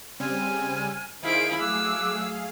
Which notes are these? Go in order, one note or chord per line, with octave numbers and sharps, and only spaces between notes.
C#3 G3 C4 G#5 F6
D#3 E4 G#4 C5 F5 D7
F#3 A3 D6 E6 F#6